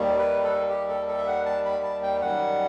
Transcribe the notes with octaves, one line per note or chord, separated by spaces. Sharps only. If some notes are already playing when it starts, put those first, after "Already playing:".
Already playing: D#2 D#3 G3
B4
A4
G4
A4
A4
E5
F#5
A5
B5
A5
G5
F#2 D#3 G3 F#5